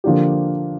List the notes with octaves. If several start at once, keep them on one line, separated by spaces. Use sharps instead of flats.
D3 F3 A#3 D4 G4